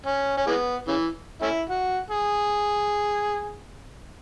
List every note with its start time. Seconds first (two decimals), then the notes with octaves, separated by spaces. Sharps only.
0.06 C#4
0.37 C#4
0.47 E3 G#3 B3
0.88 C#3 E3
1.42 A3 C#4 E4
1.70 F#4
2.10 G#4